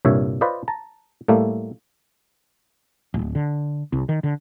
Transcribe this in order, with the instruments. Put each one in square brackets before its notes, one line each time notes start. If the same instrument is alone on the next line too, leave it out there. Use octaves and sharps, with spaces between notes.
[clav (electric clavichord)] C2 G2 A#2 C#5 E5
F4 B4 C5 D5 D#5
A5 A#5
A2 G3 A3 A#3
[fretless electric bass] D1
D3
C2
D#3
D3